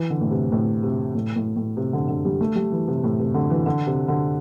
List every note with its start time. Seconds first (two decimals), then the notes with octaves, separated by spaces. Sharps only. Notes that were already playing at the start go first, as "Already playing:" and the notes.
Already playing: E3
0.10 D3
0.21 A2
0.31 C3
0.52 A2
0.83 C3
1.15 A2
1.36 A2
1.56 A2
1.77 C3
1.93 D3
2.08 D3
2.25 G3
2.41 A3
2.55 G3
2.72 E3
2.88 C3
3.04 A2
3.19 C3
3.34 D3
3.50 E3
3.66 D3
3.87 C3
4.08 D3